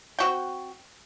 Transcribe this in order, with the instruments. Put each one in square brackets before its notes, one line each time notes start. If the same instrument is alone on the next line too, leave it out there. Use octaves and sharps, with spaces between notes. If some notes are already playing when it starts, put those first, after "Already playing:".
[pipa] C4 F#4 G5